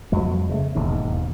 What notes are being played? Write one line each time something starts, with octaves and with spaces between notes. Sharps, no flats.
F2 F#3 G#3
C#3 G#3 A3
E1 D#2 G#2